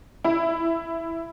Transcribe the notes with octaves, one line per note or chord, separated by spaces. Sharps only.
E4